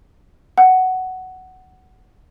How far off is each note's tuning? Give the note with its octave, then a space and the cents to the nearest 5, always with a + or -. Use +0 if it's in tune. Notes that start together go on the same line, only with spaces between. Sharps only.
F#5 +10